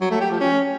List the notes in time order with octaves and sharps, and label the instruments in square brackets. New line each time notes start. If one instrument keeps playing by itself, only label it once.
[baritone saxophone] F#3
A3
G4
F3
C#4